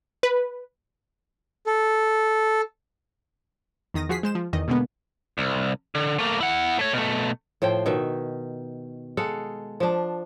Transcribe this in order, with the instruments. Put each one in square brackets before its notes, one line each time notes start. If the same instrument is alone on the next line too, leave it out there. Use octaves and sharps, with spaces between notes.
[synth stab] B4
[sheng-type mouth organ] A4
[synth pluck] E2 D#3 D#6 A#6
F3 F#4 G#4 B6 C7
G#3 C5 E7
F3
E2 D#3 D#5
B2 D3 G#3 A#3 B3
[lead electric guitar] C2
D3
A3 A#3
E4 F#5
A3 C#5
B2 A3
[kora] A2 F3 C5 G5
B2 D#3 E5
G#3 A4 F5 F#5
F3 D4